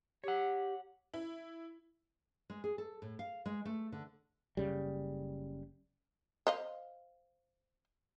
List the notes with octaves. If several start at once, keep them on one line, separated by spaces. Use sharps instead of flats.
G4 C#5 F#5
E4
G#3
G#4
A4
A2
F5
G#3
A3
D3
F#1 C#3 G3
C5 D#5 F5